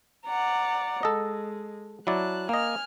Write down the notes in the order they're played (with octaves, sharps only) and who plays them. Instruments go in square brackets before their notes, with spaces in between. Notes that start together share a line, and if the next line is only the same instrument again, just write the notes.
[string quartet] D5 F#5 A#5
[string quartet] G#3 [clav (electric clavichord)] A4 D#5
[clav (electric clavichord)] F#3 E4 D5 [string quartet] A5 F#6
[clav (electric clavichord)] A#3 D#5 [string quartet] G#5 F6